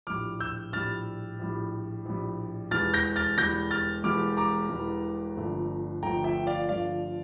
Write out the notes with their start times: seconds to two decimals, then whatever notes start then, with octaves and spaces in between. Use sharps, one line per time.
0.07 A#1 A2 G3 D6 F6
0.40 E6 G6
0.73 A#1 A2 G3 F6 A6
1.39 A#1 A2 G3
2.05 A#1 A2 G3
2.71 E1 E2 E3 G3 F6 A6
2.94 G6 A#6
3.16 F6 A6
3.38 E1 E2 E3 G3 G6 A#6
3.71 F6 A6
4.04 E1 E2 E3 G3 D6 F6
4.37 A#5 D6
4.70 E1 E2 E3 G3
5.36 G1 G2 F3 A3
6.03 G1 G2 F3 A3 G5 A#5
6.24 E5 G5
6.47 D5 F5
6.69 G1 G2 F3 A3 D5 F5